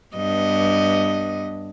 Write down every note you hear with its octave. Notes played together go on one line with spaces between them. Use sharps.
G2 B3 D#5